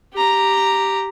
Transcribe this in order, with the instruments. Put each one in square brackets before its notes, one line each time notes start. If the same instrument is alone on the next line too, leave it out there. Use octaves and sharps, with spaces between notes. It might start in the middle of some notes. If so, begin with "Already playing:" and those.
[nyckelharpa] G4 A#5